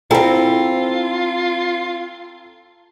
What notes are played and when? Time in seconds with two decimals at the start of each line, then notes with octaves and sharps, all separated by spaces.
0.11 C4 E4 F4 A4 G5 A#5